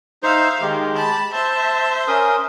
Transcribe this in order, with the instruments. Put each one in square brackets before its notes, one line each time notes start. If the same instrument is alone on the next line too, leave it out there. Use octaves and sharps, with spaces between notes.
[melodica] D#4 C5 [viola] E5 F5
[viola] D#3 [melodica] G#3 G4
[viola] A5 B5
[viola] C5 E5 [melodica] A5
[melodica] C#4 A#4 D#6